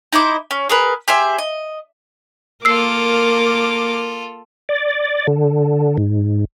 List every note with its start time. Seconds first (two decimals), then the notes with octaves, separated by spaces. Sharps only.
0.13 D#4 E4 C5 D6
0.51 C#4
0.69 G#4 A#4 B4
1.08 G4 G#4 C5 E5
1.38 D#5
2.65 A#3 F4 A4 A#4 D6 E6 C7
4.69 D5
5.27 D3
5.98 G#2